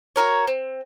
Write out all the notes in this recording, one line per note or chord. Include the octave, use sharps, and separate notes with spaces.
F#4 G4 A#4 C#5
C4